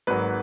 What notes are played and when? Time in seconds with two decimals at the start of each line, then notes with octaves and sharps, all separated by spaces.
0.07 G#1 G#2 F#3 A#3 B4